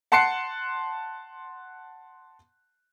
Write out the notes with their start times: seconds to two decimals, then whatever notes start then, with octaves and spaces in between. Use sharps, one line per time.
0.12 F#5 A5 C6 F#6 C7 C#7